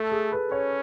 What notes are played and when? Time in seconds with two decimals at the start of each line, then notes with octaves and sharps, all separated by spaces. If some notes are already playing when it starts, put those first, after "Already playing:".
Already playing: A3 A4
0.12 G#4
0.32 B4
0.51 C#4 C#5